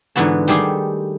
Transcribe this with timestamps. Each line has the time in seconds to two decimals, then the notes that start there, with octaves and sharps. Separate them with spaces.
0.16 G#2 D3 E3 B3 F#4 A5
0.48 D#3 G3 A3 G4 G#4 C6